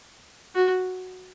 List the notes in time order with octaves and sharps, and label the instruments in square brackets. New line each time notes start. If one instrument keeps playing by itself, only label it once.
[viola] F#4